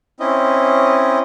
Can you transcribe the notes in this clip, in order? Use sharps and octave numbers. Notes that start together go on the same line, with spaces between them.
C4 C#4 E4 D#5